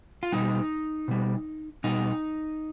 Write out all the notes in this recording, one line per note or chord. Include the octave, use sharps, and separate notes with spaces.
F4
B2 G3 D#4
B2 G3
B2 G3 D#4